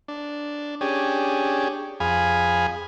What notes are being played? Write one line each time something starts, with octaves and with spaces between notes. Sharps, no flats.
D4
C#4 D4 G4 G#4
F2 G#4 F5 G#5 B5